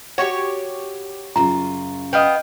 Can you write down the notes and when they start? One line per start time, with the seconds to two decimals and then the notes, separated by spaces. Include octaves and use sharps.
0.18 F#4 G4 C#5 C#6
1.36 F#2 C#3 F4 A#5
2.13 B3 D#5 F5 G5